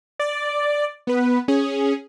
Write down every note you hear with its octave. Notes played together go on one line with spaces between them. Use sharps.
D5
B3 B4
C#4 G#4